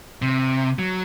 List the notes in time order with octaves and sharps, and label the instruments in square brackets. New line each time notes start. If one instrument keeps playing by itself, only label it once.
[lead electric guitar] C3
F#3